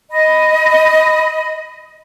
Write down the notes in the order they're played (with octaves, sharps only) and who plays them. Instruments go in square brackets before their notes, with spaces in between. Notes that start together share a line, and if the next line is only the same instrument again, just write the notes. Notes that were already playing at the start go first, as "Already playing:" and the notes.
[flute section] D#5 B5